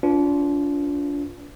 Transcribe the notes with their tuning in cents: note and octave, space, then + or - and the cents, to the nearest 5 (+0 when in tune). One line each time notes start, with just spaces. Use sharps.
D4 -35 F4 +0 B4 +0